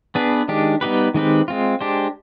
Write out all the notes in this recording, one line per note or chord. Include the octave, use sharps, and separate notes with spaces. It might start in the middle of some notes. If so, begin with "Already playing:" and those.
B3 D4 G#4 B4
D#3 G#3 D4 G4
G3 B3 D#4 G4 B4
D#3 G#3 C4 G4 B4
G#3 C4 F4
G#3 D4 G4 C5